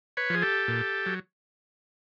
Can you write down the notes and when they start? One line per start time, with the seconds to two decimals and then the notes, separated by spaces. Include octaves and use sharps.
0.17 B4 C#5
0.30 F3 G#4
0.42 G4 A4
0.68 A#2
1.06 F#3